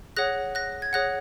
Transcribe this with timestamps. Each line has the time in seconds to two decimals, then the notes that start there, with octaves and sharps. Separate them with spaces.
0.17 G#4 C#5 F#5 F#6 A#6
0.55 F#6 A#6
0.82 G#6
0.93 G#4 C#5 F#5 F#6 A#6